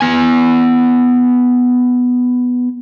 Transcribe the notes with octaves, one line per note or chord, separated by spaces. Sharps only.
B3 G#5